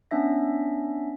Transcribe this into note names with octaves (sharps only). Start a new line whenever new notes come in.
B3 C#4 D4 E5 A#6